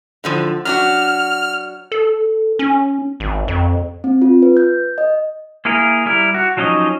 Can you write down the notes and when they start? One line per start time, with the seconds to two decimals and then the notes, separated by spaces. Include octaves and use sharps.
0.24 A2 D3 F3
0.65 F#3 D4 F#4 F6
1.92 A4
2.59 C#4
3.20 G#1
3.48 F2
4.04 C4
4.22 F4
4.42 B4
4.57 G6
4.98 D#5
5.65 A#3 E4 G#4 A#4
6.06 G3 E4 A#4
6.34 F#4
6.57 F3 F#3 C#4 D#4 D#5